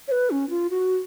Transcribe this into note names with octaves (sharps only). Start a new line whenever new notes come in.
C#5
B4
C#4
F4
F#4